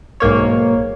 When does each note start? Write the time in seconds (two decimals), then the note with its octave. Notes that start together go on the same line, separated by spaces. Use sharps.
0.20 B1 G#2 A#3 C#5